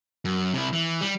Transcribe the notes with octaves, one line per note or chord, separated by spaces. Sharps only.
F#2
C3 E4
E3
G3